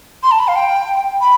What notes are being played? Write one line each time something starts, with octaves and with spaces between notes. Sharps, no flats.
C6
A5
B5
F5
G5
B5